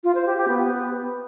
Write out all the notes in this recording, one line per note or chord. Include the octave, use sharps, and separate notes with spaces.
F4
C5
G4
G4
B3